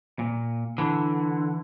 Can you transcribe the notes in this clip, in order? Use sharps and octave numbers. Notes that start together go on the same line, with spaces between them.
A#2
D3 E3